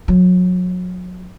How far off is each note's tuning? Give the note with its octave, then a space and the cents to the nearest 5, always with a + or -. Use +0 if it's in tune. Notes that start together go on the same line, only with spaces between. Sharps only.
F#3 -30